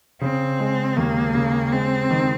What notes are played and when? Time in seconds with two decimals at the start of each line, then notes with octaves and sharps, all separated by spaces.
0.21 C#3 C4
0.60 G#3
0.97 D#2 A#3
1.35 C#3
1.72 G#3 C4
2.11 D#3